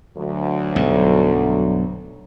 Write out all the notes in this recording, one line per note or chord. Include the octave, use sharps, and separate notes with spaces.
D2 F#3
B1 G2